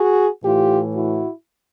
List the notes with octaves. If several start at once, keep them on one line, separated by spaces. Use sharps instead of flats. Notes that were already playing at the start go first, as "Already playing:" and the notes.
Already playing: F#4 G#4
A2 E3 F4 G4
E4 F#4